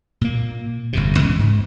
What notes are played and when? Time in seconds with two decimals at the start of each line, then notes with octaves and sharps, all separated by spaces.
0.21 A#2 A#3
0.93 G1 F2 C3
1.18 D#2 C#3 E3 G#3
1.39 G#2